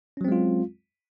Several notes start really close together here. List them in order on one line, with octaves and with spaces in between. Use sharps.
C#4 F#3 C4 G#3 F4